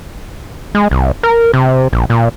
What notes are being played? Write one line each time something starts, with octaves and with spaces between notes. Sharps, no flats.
G#3
C2
A#4
C3
A#1
A#2